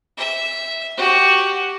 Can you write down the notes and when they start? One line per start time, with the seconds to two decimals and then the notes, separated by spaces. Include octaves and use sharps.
0.17 E5
0.97 F#4 G4